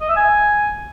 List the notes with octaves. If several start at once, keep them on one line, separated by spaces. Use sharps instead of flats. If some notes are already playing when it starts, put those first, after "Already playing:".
D#5
E5
G#5